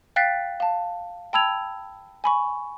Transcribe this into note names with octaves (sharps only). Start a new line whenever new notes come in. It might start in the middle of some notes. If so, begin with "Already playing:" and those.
F5 G5 F#6 A6 B6 C7
F5 A5
G5 A5 B5 E6 G#6 F7
G#5 B5 C#6